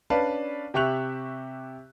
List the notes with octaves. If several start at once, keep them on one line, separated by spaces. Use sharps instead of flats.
C#4 D4 B4 D5 F5 A5
C3 G4 E5 C#6 F#6 F7